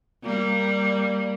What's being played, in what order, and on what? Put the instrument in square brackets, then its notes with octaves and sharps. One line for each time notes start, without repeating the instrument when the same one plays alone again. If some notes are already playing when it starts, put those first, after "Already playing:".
[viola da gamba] G3 A#3